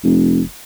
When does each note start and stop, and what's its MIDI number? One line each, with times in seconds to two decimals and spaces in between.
0.04 0.41 29